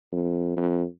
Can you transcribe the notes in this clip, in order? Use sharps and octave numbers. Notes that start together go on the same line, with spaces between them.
F2
F2